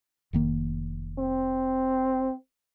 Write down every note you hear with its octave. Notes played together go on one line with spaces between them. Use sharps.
F1 D#3 A#3
C4